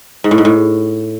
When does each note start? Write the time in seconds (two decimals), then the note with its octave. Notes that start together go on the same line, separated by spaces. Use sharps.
0.24 G#2
0.31 A2
0.38 G#2
0.45 A2